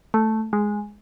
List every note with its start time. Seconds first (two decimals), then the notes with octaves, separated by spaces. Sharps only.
0.14 A3
0.53 G#3